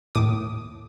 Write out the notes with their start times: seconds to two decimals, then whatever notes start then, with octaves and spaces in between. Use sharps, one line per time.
0.15 D#2 A2 D6 D#6